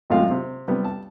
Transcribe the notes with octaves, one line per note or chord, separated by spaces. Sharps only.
G#1 F#2 A2 G#3 F4 F5
C3 C4
C3 G3 B3
A5